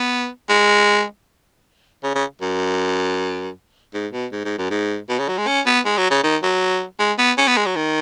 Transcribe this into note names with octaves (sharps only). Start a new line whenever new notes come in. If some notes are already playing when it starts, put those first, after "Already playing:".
Already playing: B3
G#3
C#3
C#3
F#2
G#2
B2
G#2
G#2
F#2
G#2
B2
C#3
F#3
G#3
C#4
B3
G#3
F#3
C#3
D#3
F#3
G#3
B3
C#4
B3
G#3
F#3
D#3